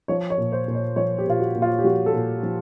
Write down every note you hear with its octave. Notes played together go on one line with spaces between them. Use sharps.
F3 C#5
C#5
A#2
C5
A#2
C#5
F3 C#5
G4
A#2 F4
F#4
A#2
F4
G4
F3 F#4
A4
A#2
F3